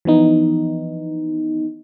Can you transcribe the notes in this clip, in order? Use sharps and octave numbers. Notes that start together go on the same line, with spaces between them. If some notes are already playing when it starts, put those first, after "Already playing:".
E3 F3 B3 D#4